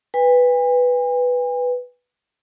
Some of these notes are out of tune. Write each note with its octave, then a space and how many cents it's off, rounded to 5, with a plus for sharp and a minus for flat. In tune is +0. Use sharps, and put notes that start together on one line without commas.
B4 +0 G#5 -45